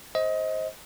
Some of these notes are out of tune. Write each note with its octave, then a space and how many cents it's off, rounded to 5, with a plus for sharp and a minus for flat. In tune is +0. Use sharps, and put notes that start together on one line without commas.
C5 +15 D#5 +25